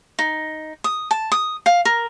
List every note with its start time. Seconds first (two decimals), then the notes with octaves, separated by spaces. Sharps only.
0.19 D#4
0.84 D#6
1.11 A5
1.32 D#6
1.66 F5
1.85 A#4